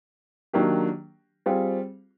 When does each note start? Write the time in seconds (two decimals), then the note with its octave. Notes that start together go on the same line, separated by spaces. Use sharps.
0.53 D#3 F#3 A#3 D4 G4
1.46 G3 C4 F4 G#4